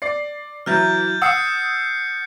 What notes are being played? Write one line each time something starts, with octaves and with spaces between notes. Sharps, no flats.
D5 C7
E3 F#3 E4 F6 G6 A6
F#5 D#6 E6 F#6 C7 C#7